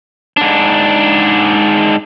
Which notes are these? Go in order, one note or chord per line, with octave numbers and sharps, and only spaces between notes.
G#2 D4